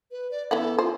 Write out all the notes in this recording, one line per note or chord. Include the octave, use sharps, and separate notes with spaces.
B4
D5
E3 B3 A4 F#5
F4 C5